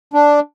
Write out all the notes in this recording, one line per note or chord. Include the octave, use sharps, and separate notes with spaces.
D4